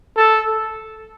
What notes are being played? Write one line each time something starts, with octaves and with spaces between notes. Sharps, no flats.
A4